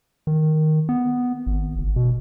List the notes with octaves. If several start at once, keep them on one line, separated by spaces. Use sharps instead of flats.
D#3
B3
G#1
F#1
B2